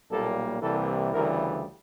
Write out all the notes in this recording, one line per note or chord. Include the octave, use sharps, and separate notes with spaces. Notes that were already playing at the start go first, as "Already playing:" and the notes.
B1 A#2 G3 A#3 A4
C2 C3 E3 G3 A#3 A4
D2 C#3 E3 G3 A#4